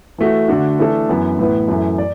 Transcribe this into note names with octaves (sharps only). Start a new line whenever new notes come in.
E3 A3 F#4
D3 A3 D4 F#4
E3 A3 D4 A4
F#2 E3 B3
A2 E3 B3
F#2 E3 A3
D5